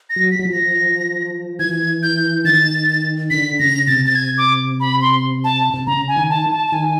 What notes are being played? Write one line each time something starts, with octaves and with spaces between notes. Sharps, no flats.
A#6
F#3
B6
F#3
F3
A#6
E3 G#6
G6
D#3 A6
D3 B6
C#3 A#6
C3 A6
A6
G#6
D6
B5
C6
A5
C3
C#3 A#5
G#5
D#3
A5
A5
A5
D#3 G#5